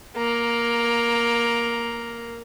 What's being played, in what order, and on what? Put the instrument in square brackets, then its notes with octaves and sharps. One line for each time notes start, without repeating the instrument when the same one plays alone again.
[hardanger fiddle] A#3 A#5